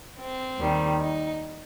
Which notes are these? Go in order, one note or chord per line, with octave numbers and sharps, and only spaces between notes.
C4
D#2 D#3 G3
D#4